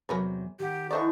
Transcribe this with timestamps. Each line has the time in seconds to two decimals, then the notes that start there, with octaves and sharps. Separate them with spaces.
0.09 E2 C3 F#3 A#4 B4 C#5
0.60 D#3 G4 F#5
0.91 D3 E3 D#4 A4 C5 D5 C#6